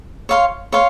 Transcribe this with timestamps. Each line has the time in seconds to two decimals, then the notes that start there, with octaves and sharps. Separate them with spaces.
0.29 C#5 F5 C6
0.72 C#5 F5 C6